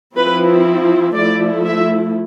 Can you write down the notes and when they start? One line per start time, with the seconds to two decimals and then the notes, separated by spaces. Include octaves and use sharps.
0.16 F3 C4 E4 B4
1.15 F3 A3 E4 D5
1.65 E5